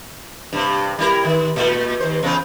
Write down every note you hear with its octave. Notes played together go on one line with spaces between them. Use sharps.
G2 C3
G3 E4 A#4
D#3
A#2 A3
D#2 C5
E2 C#3 C4